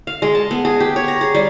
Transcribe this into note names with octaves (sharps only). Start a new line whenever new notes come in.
F5
G#3
A5
B3
G#4
G4
C#5
A#5
G#4
G3